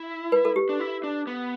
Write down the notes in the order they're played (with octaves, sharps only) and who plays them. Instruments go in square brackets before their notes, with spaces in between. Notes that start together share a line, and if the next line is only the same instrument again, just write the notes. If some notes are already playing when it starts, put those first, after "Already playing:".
Already playing: [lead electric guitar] E4
[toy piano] B4
A4
G4
[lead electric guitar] D4
E4
D4
B3